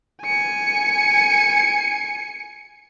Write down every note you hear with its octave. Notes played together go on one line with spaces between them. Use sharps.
G#5 C#7